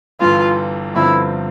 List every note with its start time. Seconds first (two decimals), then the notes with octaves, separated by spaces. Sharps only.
0.20 G1 G2 E3 F4
0.94 G1 G2 D3 F3 C4 E4